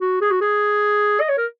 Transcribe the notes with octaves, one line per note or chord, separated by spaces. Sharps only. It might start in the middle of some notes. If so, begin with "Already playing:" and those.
F#4
G#4
F#4
G#4
D#5
C#5
A#4